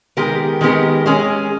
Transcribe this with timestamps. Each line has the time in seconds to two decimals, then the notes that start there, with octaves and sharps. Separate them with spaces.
0.17 D#3 G#3 B3 G4 A#4
0.61 D#3 G#3 B3 G4 A#4
1.06 G#3 C#4 G#4